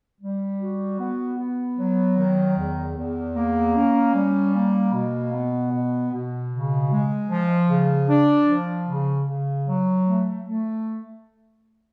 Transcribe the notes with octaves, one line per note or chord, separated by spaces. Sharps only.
G3
F#4
B3
B3
F#3
D#3
E2
E2
A#3
C#4
G3
A#3
B2
B3
B2
B2
C#3
G#3
F3
C#3
D4
F3
C#3
C#3
F#3
A3
A3